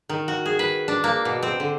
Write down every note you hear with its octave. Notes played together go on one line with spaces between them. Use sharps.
D#3
F#4
G#4
B4
D4
A#3
B2
C4
D3